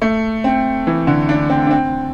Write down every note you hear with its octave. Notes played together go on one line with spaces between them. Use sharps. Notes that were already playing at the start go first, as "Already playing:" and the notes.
A3
C4
E3
D3
D4
C4
D4
C4